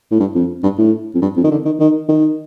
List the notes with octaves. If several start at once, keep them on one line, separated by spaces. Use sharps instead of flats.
A2
G2
F2
G2
A2
F2
G2
F2
D#3
D3
D#3
D#3
D#3